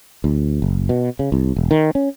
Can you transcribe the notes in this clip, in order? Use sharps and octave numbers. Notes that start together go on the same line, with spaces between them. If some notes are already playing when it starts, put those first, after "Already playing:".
D2
F#1
B2
C#3
C2
E1
D#3
C#4